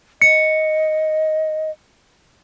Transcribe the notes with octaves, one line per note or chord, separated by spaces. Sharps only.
D#5 C#7